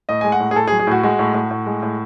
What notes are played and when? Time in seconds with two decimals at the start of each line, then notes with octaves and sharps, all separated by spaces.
0.09 A2 D#5
0.21 G#3 G#5
0.32 F#5
0.40 A2
0.51 G#4
0.56 A2 A4
0.67 G#4
0.72 F#3
0.79 G#4
0.87 A2 F#4
1.03 G#3 F#4
1.19 A2
1.34 A2
1.51 A2
1.66 G#3
1.82 A2